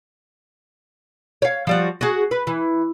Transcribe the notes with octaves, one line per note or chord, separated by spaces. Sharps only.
C#5 F5
F3 G3 F#4
F#4 G#4
B4
E3